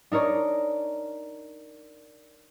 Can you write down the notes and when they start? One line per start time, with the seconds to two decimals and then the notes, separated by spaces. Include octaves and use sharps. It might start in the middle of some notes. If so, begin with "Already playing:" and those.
0.12 D4 D#4 A#4 C#5 D5